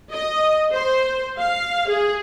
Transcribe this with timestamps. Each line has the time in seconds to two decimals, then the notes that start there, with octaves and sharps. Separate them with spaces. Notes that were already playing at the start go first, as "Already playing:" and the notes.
0.12 D#5
0.72 C5
1.38 F5
1.90 G#4